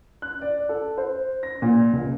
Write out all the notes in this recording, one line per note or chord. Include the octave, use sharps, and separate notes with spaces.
F#6
D5
A4
C5
A#6
A#2
C#2